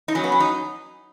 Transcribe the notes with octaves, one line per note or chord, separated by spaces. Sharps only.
D#4
F#3 C#4
B3
C#4
D#4